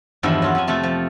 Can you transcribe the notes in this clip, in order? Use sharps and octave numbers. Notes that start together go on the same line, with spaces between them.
E2 G2 D#3 F3 E4
F#3 F4 F#4
F2 E4 G#5
C3 A3 F4 B5
F3